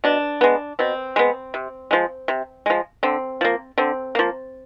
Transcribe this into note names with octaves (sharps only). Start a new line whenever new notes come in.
B2 D4
G#3 B3
B2 C4
G#3 B3
C3
F3 G#3
C3
F3 G#3
D3 C4
F3 A#3
D3 C4
F3 A#3